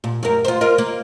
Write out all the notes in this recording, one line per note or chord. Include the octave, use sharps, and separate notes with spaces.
A#2
F#2 A#4
F4 C5
F4 A#4 D#5
A#3